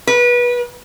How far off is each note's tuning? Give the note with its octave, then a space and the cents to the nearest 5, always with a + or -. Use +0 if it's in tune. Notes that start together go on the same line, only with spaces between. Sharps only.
B4 -25